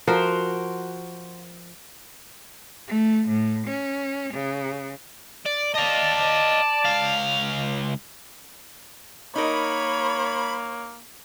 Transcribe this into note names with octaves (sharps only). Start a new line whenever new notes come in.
F3 F#4 A#4 C5
A3
A2
C#4
C#3
D5
D5 D#5 F5 A5
C#2 F5
A#3 D#4 A#4 C#5 B5